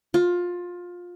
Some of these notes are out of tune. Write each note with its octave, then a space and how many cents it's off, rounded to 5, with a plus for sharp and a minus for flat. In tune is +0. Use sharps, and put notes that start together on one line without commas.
F4 +20